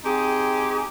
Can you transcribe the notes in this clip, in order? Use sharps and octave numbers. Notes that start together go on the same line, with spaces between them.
C4 D#4 G4 G#4